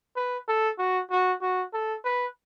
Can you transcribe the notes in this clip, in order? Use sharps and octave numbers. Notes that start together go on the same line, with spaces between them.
B4
A4
F#4
F#4
F#4
A4
B4